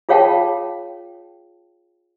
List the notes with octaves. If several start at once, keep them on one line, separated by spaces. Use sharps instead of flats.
F4 G#4 C#5 F5 G5 A5